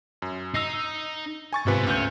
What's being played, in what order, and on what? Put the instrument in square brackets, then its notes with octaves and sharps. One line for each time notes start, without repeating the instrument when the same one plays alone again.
[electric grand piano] F#2
[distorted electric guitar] D#4 [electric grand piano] E6 A#6 C7
[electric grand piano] G#5 C#6 A6
[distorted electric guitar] G#2 B3 [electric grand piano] C3 F4 B4
[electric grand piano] D2 G6 [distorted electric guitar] C#4